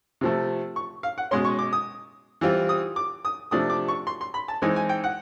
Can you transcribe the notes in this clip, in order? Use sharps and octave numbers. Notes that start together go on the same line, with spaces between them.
C3 F3 A3
C#6
F5
F#5
B2 G#3 C#4 C6
C#6
D6
D#6
E3 G3 C4 F4
D#6
D6
D#6
C3 F3 A3 D4 D#6
D6
C#6
C6
C6
B5
A5
E3 G#3 C4 D#4 G#5
G#5
G5
F#5